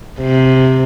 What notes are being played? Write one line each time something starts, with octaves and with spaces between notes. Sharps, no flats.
C3